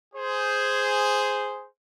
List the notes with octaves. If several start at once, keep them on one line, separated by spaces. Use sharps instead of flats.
G#4 C5